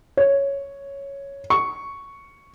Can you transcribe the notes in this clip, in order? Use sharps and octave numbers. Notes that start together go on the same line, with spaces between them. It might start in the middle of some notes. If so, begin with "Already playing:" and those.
C#5
C#6